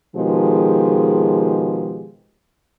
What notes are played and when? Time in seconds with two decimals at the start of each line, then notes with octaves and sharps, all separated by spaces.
0.16 B2 D#3 F3 G#3 G4 G#4